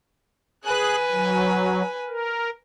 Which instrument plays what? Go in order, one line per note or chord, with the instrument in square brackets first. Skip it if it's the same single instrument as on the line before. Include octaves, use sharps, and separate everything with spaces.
[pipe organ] G#4 F#6 [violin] B4 G#5
[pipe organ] F#3
A#4